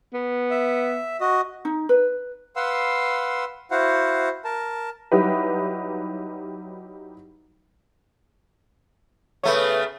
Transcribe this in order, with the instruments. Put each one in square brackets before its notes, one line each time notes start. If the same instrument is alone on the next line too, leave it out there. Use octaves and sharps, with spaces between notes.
[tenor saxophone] B3
[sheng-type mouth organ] E5
F#4 D#5
[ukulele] D#4
B4
[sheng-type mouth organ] B4 F5 F#5 C6 E6
E4 F#4 C5 F5 F#5
A#4 A5
[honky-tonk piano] F#3 G3 D#4 E4 G4 B4
[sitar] C#3 A3 B3 [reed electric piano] B4 C#5